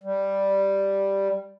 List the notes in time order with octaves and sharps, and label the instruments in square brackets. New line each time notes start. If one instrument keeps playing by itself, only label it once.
[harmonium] G3